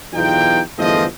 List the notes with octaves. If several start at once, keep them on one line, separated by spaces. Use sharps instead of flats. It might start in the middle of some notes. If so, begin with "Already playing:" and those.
B1 E2 D#4 F4 G5
G1 E2 F3 A3 C4 D#5